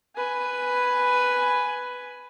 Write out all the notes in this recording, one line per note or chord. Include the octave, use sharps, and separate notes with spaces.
B4 G#5